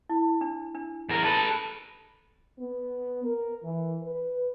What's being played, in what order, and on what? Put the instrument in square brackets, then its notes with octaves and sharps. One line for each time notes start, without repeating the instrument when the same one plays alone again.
[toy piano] E4
D4
D4
[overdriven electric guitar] E2 A#4
[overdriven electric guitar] A4 B4 [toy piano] A5
[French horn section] B3
A#4
E3
B4